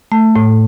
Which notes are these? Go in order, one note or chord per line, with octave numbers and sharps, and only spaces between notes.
A3
A2